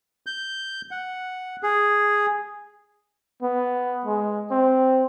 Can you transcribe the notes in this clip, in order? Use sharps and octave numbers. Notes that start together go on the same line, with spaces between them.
G6
F#5
G#4
B3
G#3
C4